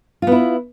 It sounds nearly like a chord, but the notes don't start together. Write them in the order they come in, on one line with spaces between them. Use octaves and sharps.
F4 B3 E4